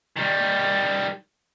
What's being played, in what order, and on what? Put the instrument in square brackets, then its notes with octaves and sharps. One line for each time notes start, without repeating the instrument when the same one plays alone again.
[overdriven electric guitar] D#3 G3